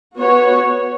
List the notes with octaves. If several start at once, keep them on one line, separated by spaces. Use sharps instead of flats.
B3 F#4 C#5